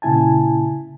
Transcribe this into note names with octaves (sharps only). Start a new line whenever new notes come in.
A#2 C#3 E4 G#5 A5